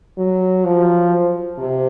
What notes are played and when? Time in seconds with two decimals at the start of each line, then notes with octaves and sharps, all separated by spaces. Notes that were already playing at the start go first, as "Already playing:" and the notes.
0.18 F#3
0.65 F3
1.58 C3